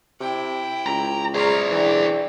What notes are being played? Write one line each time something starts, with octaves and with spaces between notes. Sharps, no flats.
C3 E4 G5
C#2 A#5
G#4 C5 D5 F5 A#5
E3 D4 G5